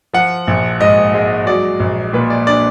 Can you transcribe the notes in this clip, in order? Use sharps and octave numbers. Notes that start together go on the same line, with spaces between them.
F3 F#5
A#1
G#2 D#5
G#3
F#3 D5
A#1
A#2 B4
D5
D4 D5